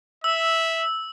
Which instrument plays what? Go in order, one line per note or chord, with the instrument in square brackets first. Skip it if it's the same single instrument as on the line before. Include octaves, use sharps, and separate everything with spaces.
[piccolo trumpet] E5 [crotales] E6